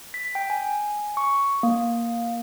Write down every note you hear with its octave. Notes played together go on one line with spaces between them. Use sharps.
B6
G5
G#5
C#6
A#3